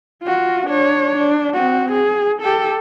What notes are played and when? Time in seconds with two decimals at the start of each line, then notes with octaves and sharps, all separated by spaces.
0.23 F4 F#4
0.66 D4 C#5
1.16 D4
1.53 C4 F#4
1.92 G#4
2.42 G4 A4